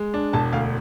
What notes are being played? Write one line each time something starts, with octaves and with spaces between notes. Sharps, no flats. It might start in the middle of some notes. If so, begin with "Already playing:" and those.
Already playing: G#3
D4
E1 A5
D2 F5